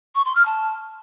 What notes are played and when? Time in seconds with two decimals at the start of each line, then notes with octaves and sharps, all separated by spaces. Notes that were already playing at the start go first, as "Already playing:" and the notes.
0.15 C#6
0.25 C6
0.35 F6
0.46 A5